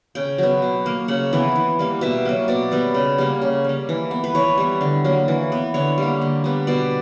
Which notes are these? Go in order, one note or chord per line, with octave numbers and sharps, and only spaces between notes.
C#3 G5
F#3 B3
B2
A#3
C#3 F#5
E3 B3
E3
G3 A#3
B2 E5
F#3 A#3
B2 D5
G3 B3
C#3
G3 A#3
C#3
G3 A#3
E3
B3
B4
E3 C#5
G3 B3
D3
F#3 A#3
E3
B3
D3 C#5
G3 A#3
D3
G3 B3
B2 D5